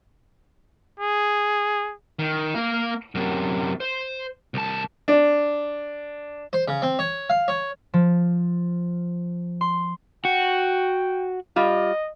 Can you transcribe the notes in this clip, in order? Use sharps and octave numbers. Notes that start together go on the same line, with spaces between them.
G#4
D#3
A#3 F5
F#2 C3
C5
C2 A5
D4
C5
C#3
C4
C#5
F5
C#5
F3
C6
F#4 G5
G3 F4 D#5